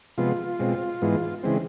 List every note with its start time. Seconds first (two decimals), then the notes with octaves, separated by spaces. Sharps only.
0.18 C3 F3 G#3 B3 F4
0.59 B2 G#3 C4
1.02 G#2 E3 G#3 B3
1.43 C#3 E3 G#3 C4